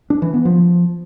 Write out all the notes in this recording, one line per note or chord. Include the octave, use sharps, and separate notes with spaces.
D4
E3
B3
F3